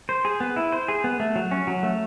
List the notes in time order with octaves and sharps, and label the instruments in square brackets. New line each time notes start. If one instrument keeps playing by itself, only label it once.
[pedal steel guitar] C5
G#4
B3
E4
C5
G#4
B3
A3
F#3
C#4
F#3
A3